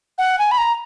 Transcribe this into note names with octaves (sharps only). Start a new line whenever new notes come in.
F#5
G#5
B5
A#5